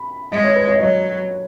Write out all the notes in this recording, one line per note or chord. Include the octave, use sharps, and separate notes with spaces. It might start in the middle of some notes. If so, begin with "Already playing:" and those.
Already playing: B5
G#3 D#5
C#5
B4
C#5
D#5
F#3 C#5